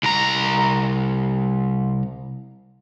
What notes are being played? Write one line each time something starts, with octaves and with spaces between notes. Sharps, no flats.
C2 A#5